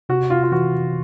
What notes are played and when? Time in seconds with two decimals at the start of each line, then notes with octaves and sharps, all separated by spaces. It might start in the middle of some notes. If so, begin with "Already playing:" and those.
0.09 C3 F#4
0.30 C3 F4
0.43 F4
0.52 E3 F#4